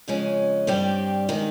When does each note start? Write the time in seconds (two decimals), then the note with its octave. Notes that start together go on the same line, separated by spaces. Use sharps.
0.08 F2 C#3 G#3 C#4
0.67 G2 G3 C4 G4
1.29 D#3 G#3 D#4